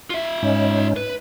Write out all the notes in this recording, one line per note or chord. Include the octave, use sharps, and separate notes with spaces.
F4 E5
G#2 C#4 D#4
B4